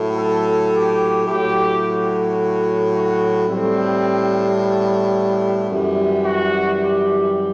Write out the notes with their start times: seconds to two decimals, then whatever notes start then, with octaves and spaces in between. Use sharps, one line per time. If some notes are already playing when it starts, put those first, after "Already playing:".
Already playing: A2 F#3
0.16 A4
0.72 G4
1.27 A2 F#3 G4
1.82 F#4
2.93 F#4
3.48 A2 G3 C4
4.59 B3
5.70 F#2 E3 G3
6.25 F#4
6.80 G4